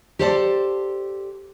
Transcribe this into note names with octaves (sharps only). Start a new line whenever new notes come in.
G4 A4 C5 D5 E5 A5